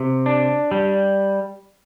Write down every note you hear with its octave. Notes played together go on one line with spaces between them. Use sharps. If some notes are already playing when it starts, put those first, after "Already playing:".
Already playing: C3
D4
G3